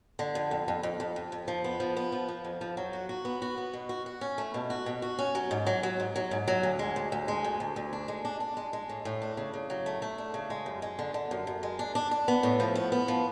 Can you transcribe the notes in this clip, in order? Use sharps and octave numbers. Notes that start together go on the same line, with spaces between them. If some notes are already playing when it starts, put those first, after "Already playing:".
D3
F2
F2
F2
F2
F2
F2
F2
F3
B3
F3
B3
F3
F3
F2
F3
F#3
F#4
F#4
B3
F#4
B3
B2
F#4
F#4
C#4
A3
B2
F#4
B2
F#4
C#4
F#3
G#2
F#3
F#3
G#2
F#3
G#2
F#3
D2
G#3
D2
D2
G#3
D2
D2
D2
D4
G#3
D4
D4
G#3
G#3
A2
A2
D4
C#3
C#3
F#3
A3
A3
D4
C#3
G#3
F#2
G#3
D3
D3
F#2
F#2
G#3
D4
D4
D4
B3
A2
F3
B3
B3
F3